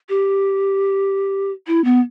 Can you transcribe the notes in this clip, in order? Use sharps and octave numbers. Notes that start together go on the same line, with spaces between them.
G4
E4
B3